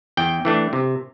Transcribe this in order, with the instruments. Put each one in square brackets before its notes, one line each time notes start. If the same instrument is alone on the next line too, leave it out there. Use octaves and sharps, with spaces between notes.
[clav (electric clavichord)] E2 G5
E3 A3 D4
C3